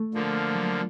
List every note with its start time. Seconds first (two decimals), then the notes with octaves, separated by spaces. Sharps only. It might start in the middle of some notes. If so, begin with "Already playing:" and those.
Already playing: A3
0.14 D3 F3 A#3
0.55 F#3